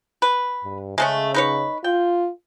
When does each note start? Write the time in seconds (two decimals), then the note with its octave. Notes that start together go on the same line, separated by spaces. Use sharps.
0.22 B4
0.64 G2
0.98 C#3 G#3 A3 C#4
1.34 D#4 B4 C#5
1.84 F4 G5